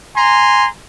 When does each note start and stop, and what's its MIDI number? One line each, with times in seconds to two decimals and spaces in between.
0.16 0.68 80
0.16 0.68 82
0.16 0.68 84